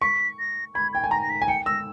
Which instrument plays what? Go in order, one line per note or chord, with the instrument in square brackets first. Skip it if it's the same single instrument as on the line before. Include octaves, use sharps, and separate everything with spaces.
[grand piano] C#6 [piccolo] B6
[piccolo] A#6
[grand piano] B5 [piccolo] G#6
[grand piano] G5 [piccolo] G#6
[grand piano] G#5
[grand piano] A#5 [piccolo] A#6
[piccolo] A#6
B6
[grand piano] G#5
[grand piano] G5 [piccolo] C#7
[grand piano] E6 [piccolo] A#6